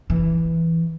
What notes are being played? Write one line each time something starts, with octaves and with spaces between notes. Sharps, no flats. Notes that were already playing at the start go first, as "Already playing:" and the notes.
E3